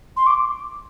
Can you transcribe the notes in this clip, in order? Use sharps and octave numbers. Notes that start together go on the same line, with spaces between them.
C6
D6